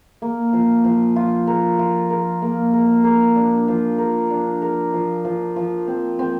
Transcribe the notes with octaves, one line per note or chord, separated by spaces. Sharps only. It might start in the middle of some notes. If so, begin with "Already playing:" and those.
A#3
F3
F3
F4
A#4
F4
A#4
A#3
A#4
A#4
D4
F3
A#4
D4
A#4
F3
F3
F3
C4
C4